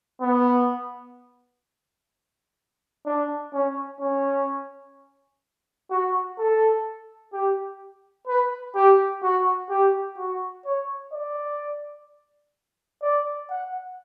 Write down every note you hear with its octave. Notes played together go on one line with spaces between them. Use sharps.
B3
D4
C#4
C#4
F#4
A4
G4
B4
G4
F#4
G4
F#4
C#5
D5
D5
F#5